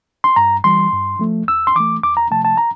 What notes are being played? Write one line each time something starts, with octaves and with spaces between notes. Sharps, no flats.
C6
G2 A#5
E3 G3 C6
G2
F3 A3
E2 E6
C6
E3 A3 D6
E2 D6
A#5
C3 F3 A3 A5
A5
A#5